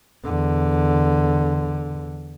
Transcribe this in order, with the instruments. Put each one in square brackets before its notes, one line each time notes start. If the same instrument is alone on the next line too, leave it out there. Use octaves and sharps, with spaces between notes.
[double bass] E2 D3